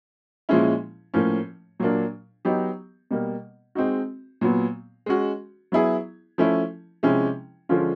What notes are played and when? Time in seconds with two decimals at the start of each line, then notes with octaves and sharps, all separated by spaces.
0.49 A#2 F3 G#3 C#4 E4
1.14 A2 F3 A#3 C#4
1.80 A#2 F#3 A#3 D4
2.45 F#3 B3 D#4 G4
3.11 B2 G3 A#3
3.75 G#3 C4 D#4 F#4
4.41 A#2 F#3 B3
5.06 G#3 C#4 F#4
5.72 F#3 B3 E4 G#4
6.38 F3 A3 C#4 E4
7.03 C3 F3 G#3 C#4 E4
7.69 D3 F3 G#3 C#4 F4